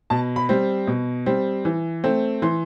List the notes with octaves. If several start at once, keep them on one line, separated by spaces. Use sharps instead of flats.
B2 A5
B5
G3 C4
B2
G3 C4
E3
A3 C4
E3 C6